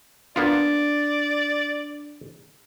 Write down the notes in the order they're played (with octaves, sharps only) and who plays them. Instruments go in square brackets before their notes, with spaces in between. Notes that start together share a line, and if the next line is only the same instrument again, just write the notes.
[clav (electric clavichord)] A#3 B3 F4 [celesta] D4 F7 [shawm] D5